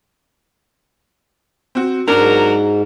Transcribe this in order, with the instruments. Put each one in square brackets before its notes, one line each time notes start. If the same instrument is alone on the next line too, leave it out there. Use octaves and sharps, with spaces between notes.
[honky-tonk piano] C4 F#4
[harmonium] G#2 [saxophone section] F#3 A#4 [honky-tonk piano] D4 A#5